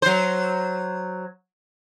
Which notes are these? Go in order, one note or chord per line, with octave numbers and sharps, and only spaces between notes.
F#3 C5